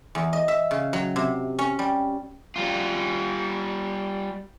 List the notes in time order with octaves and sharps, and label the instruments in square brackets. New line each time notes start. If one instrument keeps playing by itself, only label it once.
[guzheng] E2
D#5
E5
C#3
F#3
C3
C#4
G3
[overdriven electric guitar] G3 F4